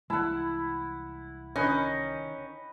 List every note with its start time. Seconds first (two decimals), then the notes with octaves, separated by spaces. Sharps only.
0.10 C2 E3 G#3 E4 F#5 A5
1.56 D#3 C#4 B4 D#5 G5